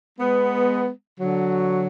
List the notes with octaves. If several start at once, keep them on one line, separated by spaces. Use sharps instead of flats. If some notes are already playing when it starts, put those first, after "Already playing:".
G#3 B3
D3 F#3